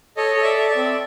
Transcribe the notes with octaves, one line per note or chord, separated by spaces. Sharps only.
A4 C#5 D#5
A4
D5 E5
A4
D5 E5
C4